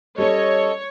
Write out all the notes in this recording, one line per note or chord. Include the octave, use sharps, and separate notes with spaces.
G3 C#4 A4 C#5 D#5